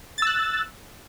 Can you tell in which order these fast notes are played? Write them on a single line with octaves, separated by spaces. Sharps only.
A6 E6 F#6